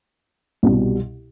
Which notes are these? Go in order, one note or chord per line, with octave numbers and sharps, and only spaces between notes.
C2 B2 G3